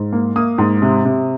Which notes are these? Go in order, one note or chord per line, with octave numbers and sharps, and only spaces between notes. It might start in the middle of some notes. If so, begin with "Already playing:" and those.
Already playing: G#2
A#3
A#3 D#6
G#2
C3
C3